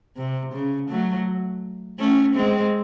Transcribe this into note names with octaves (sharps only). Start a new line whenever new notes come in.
C3
C#3
F#3 A3
A3 C#4
G#3 C4